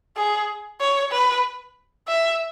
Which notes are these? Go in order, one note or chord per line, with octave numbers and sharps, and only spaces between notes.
G#4
C#5
B4
E5